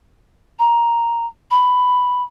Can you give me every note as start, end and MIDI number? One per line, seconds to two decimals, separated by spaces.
0.59 1.26 82
1.51 2.23 83